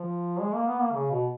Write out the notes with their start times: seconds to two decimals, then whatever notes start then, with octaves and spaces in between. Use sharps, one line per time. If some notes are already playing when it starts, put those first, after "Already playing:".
Already playing: F3
0.41 G#3
0.54 A#3
0.67 B3
0.80 A#3
0.93 C#3
1.11 B2